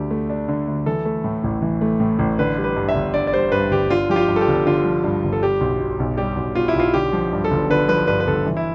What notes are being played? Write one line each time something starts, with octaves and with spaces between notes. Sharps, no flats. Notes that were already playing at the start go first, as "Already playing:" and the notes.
Already playing: D2 D3 A3 D4 G4
A3
D4
D3
D2
E3 A4
A3
A2
A1
E3
A3
A2
A1
D3 B4
G3
B4
G2
E5
G1
D3 D5
D5
G3 C5
G2 B4
G1 G4
D3 F4
F3 G4
F4
G2
A4
G4
G1
D3 F4
F3
G2
G1
A4
G3 G4
B1
B2
B1
G3 G4
B1
B2 F4
E4
B1 F4
D3 G4
F3
G2
A4
G1
D3 B4
F3 B4
G2 B4
B4
G1 A4
E3
E4